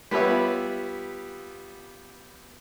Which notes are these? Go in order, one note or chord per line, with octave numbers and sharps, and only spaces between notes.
G3 B3 F4 B4 C#5 E5